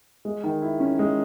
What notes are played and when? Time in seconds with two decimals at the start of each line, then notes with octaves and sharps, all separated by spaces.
0.25 G#3
0.44 D#3
0.62 E4
0.80 C#4
0.99 G#3